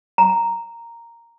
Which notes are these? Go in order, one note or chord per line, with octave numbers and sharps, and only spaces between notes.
A#5